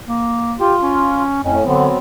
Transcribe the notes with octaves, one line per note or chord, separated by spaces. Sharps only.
A#3
F4 G4
C#4
F2 A2 C#4
D3 F#3 B3 C4